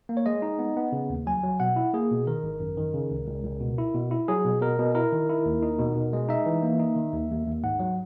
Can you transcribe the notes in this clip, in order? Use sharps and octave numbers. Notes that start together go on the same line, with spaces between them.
A#3
C#5
G#3 D#5
D#4
B3
B3
C#3
D#2
F#3 G#5
F#3
B2 F#5
E4
A#3 G#4
B2
D#3 A#4
G#1
F#2
D#3
C#3
C#2
C#2
C#2
B2
E4
B2
E4
F#3 G#4
B2
B2 A#4
B2
E4 A#4
D#3
E4
D#2
D#4
B2
B2
G#3
D#4 E5
E3
A#3
D#4
D#3
D#2
D#2
D#2
G#2 F#5
F#3